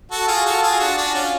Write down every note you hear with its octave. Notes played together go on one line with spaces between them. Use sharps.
F#4 A4
F4 G#4
F#4 A4
F4 G#4
D4 F#4
D4 F#4
C#4 F4